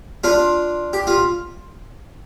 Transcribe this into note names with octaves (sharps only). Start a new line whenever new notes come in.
D4 F4
G4
F4